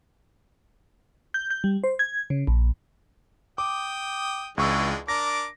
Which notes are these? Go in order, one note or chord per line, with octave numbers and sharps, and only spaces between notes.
G6
G6
G3
C5
G#6
C#3
A#1
G5 D6 D#6
C#2 E3 G#3 D4 C#6 E6
D4 A#4 D6 A#6